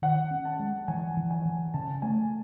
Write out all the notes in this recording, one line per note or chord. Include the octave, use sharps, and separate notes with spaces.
D#3 F#5
C#4
A5
G#3
E3 G#5
E3
G#5
E3
C#3 A5
A3 G#5